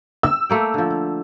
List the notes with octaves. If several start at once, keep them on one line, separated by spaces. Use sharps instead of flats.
E6
A3 A#3 G5
D3 F3